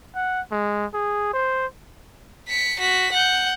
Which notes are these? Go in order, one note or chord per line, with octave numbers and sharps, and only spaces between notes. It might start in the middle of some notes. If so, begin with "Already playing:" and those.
F#5
G#3
G#4
C5
B6 C#7
F#4 B6
F#5 G6